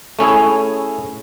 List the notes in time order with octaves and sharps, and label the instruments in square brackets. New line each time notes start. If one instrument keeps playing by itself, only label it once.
[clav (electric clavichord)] A3 C#4 E4 G#4